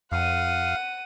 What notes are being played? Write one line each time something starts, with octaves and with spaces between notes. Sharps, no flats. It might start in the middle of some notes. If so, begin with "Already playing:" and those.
F2 F5 F#5 D#7